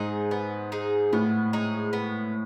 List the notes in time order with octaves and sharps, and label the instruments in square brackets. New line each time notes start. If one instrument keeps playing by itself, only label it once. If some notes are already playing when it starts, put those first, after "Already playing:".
Already playing: [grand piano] G#2 [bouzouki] D#4 G#4
[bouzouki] B3
D#4 G#4
[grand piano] A2 [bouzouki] B3
[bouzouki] D#4 G#4
B3